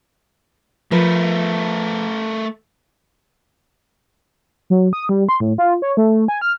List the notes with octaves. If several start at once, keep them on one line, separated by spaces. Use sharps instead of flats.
F3 A3 A#4 B4
F#3
D#6
G3
C6
A2
F4
C#5
A3
G#5
F6